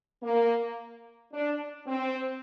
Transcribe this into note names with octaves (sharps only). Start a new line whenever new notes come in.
A#3
D4
C4